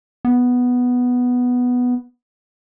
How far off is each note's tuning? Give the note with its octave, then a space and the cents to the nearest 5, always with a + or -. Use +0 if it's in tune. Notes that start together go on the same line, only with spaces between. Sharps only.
B3 +0